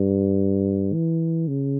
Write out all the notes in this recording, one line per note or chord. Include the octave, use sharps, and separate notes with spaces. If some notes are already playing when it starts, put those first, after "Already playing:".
Already playing: G2
E3
C#3